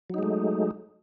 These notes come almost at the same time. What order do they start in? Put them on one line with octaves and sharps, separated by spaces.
F#3 D#4 G#3 A3